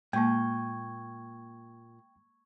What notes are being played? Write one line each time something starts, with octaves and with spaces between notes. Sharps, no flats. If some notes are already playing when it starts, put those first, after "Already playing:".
A#2 G#3 A#3 G5 C#6 G#6